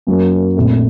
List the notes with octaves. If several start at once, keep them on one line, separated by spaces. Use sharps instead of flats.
F#2 F#3 A#3
A#1 A#2 A3 C4